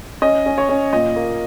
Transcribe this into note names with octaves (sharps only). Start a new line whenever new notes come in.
C#4 D#5
C#4
C#5
C#4
A#2 D#5
A#3